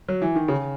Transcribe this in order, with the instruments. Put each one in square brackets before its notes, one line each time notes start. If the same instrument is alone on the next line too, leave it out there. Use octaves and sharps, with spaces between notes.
[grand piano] F#3
E3
D#3
C#3